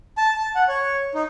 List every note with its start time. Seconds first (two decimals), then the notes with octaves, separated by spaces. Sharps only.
0.17 A5
0.36 A5
0.55 F#5
0.68 C#5
1.15 D#4